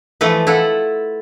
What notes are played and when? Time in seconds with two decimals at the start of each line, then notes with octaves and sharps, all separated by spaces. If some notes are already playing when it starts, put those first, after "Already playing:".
0.21 E3 F3 A3 A4 B4
0.47 E4 F4 A4 F#5